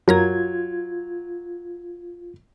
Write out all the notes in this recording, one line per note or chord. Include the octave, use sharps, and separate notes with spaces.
F#2 F#3 F4 A#4 A#5 G#6